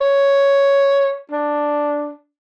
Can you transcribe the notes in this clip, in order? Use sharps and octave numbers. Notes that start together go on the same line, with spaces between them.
C#5
D4